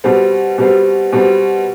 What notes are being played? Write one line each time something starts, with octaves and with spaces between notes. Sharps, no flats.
B2 G3 C4
B2 G3 C4
B2 G3 C4